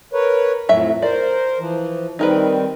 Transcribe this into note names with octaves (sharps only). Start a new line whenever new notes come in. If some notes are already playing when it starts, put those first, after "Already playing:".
A#4 B4 C#5
F2 A2 F#3 E5
A#4 C5 D5
E3 F3
D#3 G3 C4 D#4 A#4 B4